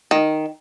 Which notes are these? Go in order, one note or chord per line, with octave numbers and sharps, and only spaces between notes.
D#3